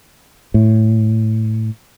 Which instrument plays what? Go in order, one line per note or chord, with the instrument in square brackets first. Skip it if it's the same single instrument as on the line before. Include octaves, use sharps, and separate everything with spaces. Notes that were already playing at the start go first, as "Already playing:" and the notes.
[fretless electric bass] A2